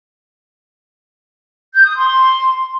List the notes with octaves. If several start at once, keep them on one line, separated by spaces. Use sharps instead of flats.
G6
D#6
C6